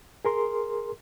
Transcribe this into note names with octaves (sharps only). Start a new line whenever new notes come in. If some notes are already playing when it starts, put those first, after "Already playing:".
G#4 A#4 C6